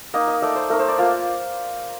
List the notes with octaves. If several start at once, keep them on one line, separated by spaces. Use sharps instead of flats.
A#3 D#4 D#5
D#5
A3 D#4 D5
C5
A3 D#4 A#4
C5
D5
A#3 F4 F5